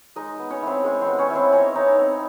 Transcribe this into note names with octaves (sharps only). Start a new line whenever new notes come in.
G#3 D#4 D#5
B3
C#4 C#5
C4 E4 C5
G#3 C#4 C#5
C4 C5
B3
C5
C#4 C#5
E4
C4 C5
C#4 D#4 C#5
D#4
C4